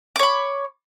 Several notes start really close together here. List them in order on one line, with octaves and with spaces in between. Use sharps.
D6 C#5 B5